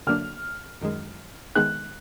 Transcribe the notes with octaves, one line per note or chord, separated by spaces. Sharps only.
D3 F#3 A#3 D4 F6
F#2 D#3 G#3
D#3 G#3 B3 D#4 G#4 F#6